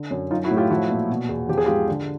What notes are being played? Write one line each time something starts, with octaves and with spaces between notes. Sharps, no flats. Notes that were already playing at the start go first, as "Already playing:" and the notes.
Already playing: D3
F#2
F#3 D#4 F4
E4 F#4
A2
F4 G4
F3 E4 F#4
A#2
B2
E2
F3 G4
G#4
G#2 F4 G4
D3